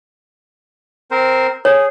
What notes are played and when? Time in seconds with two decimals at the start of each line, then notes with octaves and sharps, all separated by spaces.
1.11 C4 A#4 C5
1.65 G#4 C#5